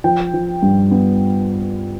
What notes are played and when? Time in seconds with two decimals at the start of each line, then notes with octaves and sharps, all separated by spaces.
0.04 F3 G5
0.34 F3
0.62 G2
0.91 B3